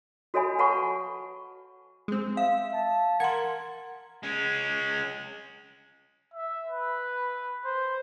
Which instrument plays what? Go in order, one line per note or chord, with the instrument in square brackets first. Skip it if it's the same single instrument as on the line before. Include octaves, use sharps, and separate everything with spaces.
[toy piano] F#4 A4 C#5 D#5 G#5 B5
A4 B4 F#5 A5 B5 C#6
[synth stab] G#3 C4
[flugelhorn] E5 [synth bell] F5
[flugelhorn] A5
[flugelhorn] A#4 [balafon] F#5 C6 [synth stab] G#6
[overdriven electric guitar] G#3 C#4
[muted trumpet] E5
B4
C5